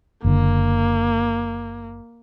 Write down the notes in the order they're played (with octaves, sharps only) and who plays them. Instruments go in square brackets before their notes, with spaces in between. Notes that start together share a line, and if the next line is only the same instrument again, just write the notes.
[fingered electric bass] F#1 D3 [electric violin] A#3